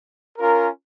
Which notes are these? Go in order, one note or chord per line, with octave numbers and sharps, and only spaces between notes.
C#4 F4 A#4